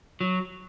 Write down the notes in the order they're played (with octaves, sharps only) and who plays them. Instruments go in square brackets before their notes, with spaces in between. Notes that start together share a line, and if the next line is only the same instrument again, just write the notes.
[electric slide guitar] F#3